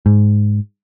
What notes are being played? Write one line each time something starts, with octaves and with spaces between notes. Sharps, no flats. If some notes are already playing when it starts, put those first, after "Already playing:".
G#2